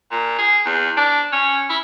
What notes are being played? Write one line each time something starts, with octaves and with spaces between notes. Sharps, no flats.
A#2
G#4
E2
D4
C#4
E4